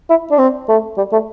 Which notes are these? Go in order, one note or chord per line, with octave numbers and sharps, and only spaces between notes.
E4
D4
C4
A3
G3
A3